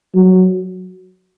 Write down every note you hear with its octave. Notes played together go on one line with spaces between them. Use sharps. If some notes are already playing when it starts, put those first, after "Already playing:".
F#3